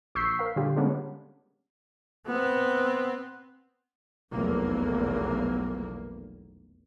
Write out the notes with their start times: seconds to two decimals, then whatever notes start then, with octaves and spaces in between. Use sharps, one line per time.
0.15 A#1 C#6 E6 G6 B6 C7
0.39 A#4 F5
0.56 A#2 D3 G3 F4 G4
0.76 G3 G#3 A#3 B3 C#4 D4
2.27 B3 C4
4.32 F1 B1 E2 A#3